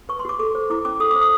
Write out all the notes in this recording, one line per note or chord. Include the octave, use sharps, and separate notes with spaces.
B4 C#6
C6
F#4 D6
A4 D6
C5
E4 D6
C#4 D6
A4 D#6
C5 D6
D#6